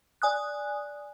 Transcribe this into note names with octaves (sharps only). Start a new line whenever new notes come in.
D5 G#5 D#6 F#6